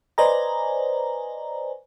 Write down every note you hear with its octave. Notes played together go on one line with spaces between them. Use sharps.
B4 C5 D5 D#5 G#5 A#5